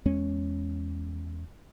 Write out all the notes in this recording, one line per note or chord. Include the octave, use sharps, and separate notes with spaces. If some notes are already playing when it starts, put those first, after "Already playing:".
E2 G#3 C#4